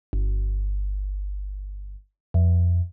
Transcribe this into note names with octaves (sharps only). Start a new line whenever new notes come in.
G1
F2